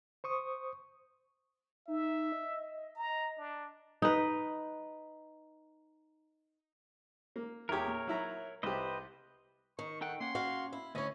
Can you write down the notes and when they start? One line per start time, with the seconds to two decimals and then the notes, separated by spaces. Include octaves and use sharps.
0.24 C5 C#6 D#6
1.88 D#4 E5
2.32 D#5
2.96 A#5
3.38 D4
4.02 D#4 B4
7.36 A#3
7.69 E2 G4 A#4 C#5
7.88 A#2
8.07 F#3 E4 A#5
8.63 C2 G4 B4 C5 D#5
9.79 D#3 C#6
10.01 D#4 A4 F#5 G5
10.20 A#3 C#4 F#5 C6
10.35 F#4 F5
10.73 E4
10.95 D2 C#4 E4 C#5 D#5